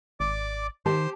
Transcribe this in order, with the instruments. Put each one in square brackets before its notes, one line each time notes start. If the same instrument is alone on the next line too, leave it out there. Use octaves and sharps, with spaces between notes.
[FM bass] G#1 [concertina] D5 D6
[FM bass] D#3 [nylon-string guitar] G4 A5 [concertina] C5 C6